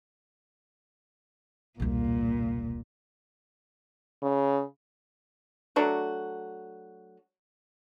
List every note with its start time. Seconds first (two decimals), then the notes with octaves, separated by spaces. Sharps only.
1.80 E1 C2 A#2
4.22 C#3
5.76 F#3 A3 D4 F#4